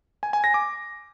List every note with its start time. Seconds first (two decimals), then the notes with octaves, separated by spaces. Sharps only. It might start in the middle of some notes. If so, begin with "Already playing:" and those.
0.23 G#5
0.33 G#5
0.44 A#6
0.54 D6